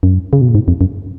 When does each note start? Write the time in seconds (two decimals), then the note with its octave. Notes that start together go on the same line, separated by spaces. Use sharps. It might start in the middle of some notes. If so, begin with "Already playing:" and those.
0.03 F#2
0.33 C#3
0.41 B2
0.49 A#2
0.55 G#2
0.68 F2
0.81 F#2